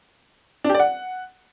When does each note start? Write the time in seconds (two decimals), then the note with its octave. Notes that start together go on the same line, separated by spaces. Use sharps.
0.64 D4
0.69 G4
0.75 D5
0.80 F#5